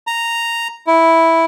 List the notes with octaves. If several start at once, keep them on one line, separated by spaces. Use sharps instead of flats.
A#5
E4